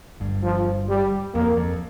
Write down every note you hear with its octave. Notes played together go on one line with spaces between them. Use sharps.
G1 G2
F3
G3
F2 A#3
F2